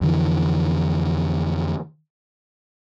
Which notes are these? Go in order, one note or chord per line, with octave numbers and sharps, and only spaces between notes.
F2 D3 E3